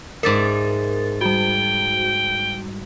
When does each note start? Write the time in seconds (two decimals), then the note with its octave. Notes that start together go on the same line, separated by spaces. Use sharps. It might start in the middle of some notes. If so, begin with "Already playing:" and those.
0.23 G#2 A#4 D5 E5 A6
1.21 G3 F#4 G5